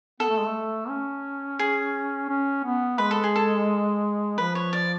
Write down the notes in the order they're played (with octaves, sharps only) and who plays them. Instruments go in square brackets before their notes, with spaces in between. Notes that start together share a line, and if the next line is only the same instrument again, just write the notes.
[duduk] B3 [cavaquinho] A4
[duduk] A3
G#3
A3
C#4
[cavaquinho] G#4
[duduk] C#4
B3
[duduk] G#3 [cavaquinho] B4
[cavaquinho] A4
G#4
A4
[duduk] F3 [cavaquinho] B4
[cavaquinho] C#5
D5